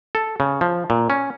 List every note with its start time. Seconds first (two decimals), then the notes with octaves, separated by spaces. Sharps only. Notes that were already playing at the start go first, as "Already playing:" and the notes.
0.15 A4
0.40 C#3
0.61 F3
0.90 A#2
1.10 C#4